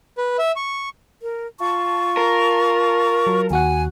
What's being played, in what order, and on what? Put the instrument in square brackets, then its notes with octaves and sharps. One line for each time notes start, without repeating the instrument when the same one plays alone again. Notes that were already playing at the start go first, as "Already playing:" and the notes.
[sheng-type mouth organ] B4
E5
C#6
[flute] A#4
[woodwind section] F4 A5 [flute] C#6
[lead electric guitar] A#4
[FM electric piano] F#3
[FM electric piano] D#2 F#4 F#5 [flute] G#5